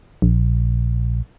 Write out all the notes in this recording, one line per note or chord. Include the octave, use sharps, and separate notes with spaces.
A#1